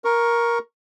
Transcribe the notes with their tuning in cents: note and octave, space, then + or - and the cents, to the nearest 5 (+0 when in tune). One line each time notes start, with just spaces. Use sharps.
A#4 +10 C#6 +0